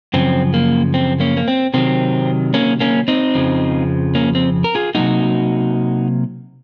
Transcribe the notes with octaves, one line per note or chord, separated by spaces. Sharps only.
F#2 C#3 F3 C4
A#3
C4
A#3 C#4
A#3
C4
C3 D#3 F#3 C4
A#3 C#4
A#3 C#4
C4 D#4
F2 C#3 F3
A#3 C#4
C4
A#4
F4 G#4
C3 F#3 A#3 D#4 F#4